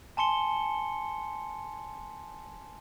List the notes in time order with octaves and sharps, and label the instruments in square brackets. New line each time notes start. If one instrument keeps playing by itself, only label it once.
[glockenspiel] G#5 A5 C6 C#7 G7